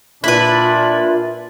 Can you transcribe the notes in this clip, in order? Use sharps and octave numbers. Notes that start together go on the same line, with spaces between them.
A#2 D4 E4 F4 B4